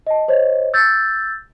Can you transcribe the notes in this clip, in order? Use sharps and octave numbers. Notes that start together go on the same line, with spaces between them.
D#5 A5
C5 C#5 D#5
E6 G6 A6